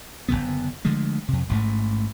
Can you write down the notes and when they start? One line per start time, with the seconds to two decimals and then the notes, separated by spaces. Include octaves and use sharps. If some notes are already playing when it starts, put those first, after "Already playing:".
0.28 F#1 F#2 D3 B3
0.85 D3 F3 G#3 A3
1.28 F2 C3
1.49 A1 G#2 A3